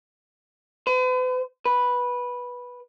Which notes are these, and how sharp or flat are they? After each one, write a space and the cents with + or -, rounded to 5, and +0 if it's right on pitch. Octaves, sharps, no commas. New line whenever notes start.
B4 +45
B4 -10